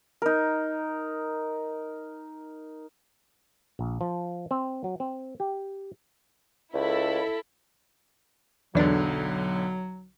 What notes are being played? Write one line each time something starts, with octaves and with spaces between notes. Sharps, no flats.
D#4 A#4
A#1
F3
C4
F#3
C4
G4
C#2 E4 A4 B5
B1 E2 D3 F#3 D4